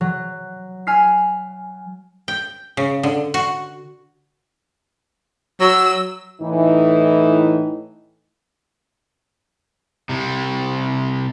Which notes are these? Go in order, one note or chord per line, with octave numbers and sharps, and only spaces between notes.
F#3
G#5 F6 B6 C7
G5
C#3
D3
F#4
F#3 E6
A2 E3 D#4
C3 G3